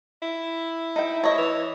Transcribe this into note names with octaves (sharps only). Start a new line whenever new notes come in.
E4
D#4 G5
C#5 D#5
E3